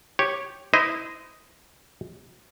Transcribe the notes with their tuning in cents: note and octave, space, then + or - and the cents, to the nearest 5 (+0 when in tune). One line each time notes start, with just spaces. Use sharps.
G4 +0 C#5 -5
E4 -20 C5 -30 D#5 +0